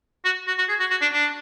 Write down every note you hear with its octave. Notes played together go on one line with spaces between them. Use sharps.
F#4
F#4
F#4
G#4
F#4
F#4
D4
D4